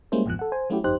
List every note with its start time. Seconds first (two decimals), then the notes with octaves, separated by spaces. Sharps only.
0.12 G3 G#3 A#3 C#4 E4 C5
0.26 A1 F2 G#2 B2 F3 F#6
0.39 A4 F#5
0.52 C5 G#5
0.70 F#3 A3 C#4 E4 F#4 G4
0.84 G1 F2 D#4 G4 C5 F#6